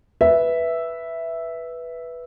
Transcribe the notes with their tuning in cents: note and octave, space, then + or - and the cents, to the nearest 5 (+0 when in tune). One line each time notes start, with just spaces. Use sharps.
B4 -5 E5 +0